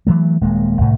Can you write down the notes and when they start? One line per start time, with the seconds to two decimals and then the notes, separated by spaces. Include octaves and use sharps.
0.07 E3 F#3 A3
0.41 D#1 G#3 A#3
0.81 C2 A2